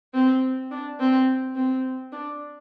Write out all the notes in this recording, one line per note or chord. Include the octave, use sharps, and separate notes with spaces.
C4
D4
C4
C4
D4